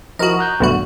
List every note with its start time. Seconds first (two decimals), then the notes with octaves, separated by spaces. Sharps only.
0.19 F3 E4 F#4 A#4 D#5
0.39 A#5 F#6 G6
0.60 B1 E2 G2 A3 F#4